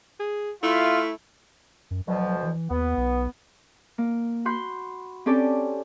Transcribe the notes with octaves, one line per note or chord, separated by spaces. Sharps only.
G#4
A3 E4 F4
F#2
D2 B2 F3 F#3
E3
D#2 B3
B1
A#3
F#4 B5 C6 G6
C4 C#4 G4 A4 D5